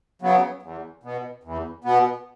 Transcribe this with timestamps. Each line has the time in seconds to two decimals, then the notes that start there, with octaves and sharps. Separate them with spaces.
0.22 C#3 F#3 B3
0.63 E2
1.03 B2 B3
1.44 E2
1.84 B2 B3